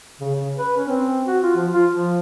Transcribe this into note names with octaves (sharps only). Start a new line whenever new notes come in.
C#3
C#3
B4
C#4
C4
F#4
F4
F3
F4
F3